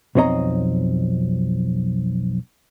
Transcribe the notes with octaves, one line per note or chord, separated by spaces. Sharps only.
B1 F2 C4 C#5 D#5 A#5